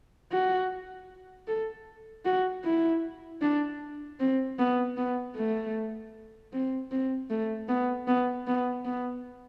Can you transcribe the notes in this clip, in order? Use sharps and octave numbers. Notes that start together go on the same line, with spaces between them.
F#4
A4
F#4
E4
D4
C4
B3
B3
A3
C4
C4
A3
B3
B3
B3
B3